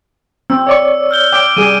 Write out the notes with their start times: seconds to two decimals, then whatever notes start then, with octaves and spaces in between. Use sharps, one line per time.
0.50 C4 E6
0.67 C#5 D5 C#6
1.11 F6 G6 G7
1.32 G5 D6 D7
1.57 G3 G#4 D#7